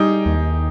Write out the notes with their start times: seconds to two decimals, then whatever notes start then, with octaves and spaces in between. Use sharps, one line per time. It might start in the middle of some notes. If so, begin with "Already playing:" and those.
Already playing: G3 D#4 G4 G#4
0.26 D#2